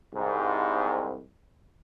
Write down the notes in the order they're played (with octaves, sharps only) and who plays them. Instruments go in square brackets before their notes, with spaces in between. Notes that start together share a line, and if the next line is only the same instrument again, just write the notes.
[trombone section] C2 G#2